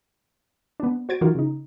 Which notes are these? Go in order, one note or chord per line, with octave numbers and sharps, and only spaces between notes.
B3 D4
F#4 C5 G#6 A6 D7
E3 F#3 D#4 F4 F#4 A#4
C#3 D#4